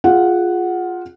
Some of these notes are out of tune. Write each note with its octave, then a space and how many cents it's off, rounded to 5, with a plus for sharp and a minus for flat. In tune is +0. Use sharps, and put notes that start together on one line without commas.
F4 +10 G#4 +0 F#5 +0